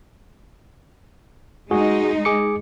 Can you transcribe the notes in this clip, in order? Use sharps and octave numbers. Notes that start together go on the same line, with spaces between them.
G#3 D#4 F#4 G#4
G#4 D6 C#7